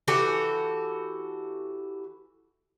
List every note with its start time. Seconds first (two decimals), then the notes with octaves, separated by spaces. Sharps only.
0.08 E3 F#4 G4 A4